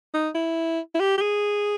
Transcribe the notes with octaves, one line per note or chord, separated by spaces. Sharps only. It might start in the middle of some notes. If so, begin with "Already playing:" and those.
D#4
E4
E4
G4
G4
G#4